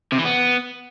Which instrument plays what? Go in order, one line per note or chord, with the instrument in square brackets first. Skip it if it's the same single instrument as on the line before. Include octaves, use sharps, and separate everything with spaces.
[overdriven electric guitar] C3
E3
B3